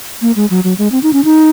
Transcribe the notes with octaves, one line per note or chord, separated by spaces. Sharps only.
A#3
G#3
F#3
F#3
G#3
C4
D#4
C#4
D#4